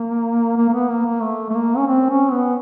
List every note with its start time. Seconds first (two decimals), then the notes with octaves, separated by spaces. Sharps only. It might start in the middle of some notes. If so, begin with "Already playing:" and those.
Already playing: A#3
0.57 A#3
0.69 A#3
0.73 B3
0.90 A#3
1.06 A#3
1.22 A3
1.50 A3
1.55 A#3
1.77 C#4
1.87 C4
2.10 C#4
2.31 B3